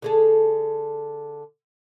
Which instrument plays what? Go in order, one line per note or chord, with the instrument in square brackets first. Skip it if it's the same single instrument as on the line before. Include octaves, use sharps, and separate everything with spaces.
[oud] D3 G#4 A4